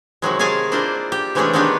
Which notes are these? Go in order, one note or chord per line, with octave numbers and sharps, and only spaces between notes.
C3 D#3 F#3 G#3
G#3 G#4 F5 G#5 A5
A#3 D4 E4 F4 C5
G4
C3 E3 G#3 A3 C#4 D4
D#3 G#3 B3 D4 G4 B4